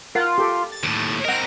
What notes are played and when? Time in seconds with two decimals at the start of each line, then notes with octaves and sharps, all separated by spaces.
0.15 F4 A#4 F#5
0.38 G4 A4
0.72 A6
0.83 D#2 A2
1.25 C4 A#4 D#5 F#5 A#6